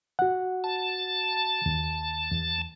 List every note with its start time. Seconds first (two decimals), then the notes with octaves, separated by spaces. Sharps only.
0.19 F#4 F#5
0.64 A5
1.66 D#2
2.31 E2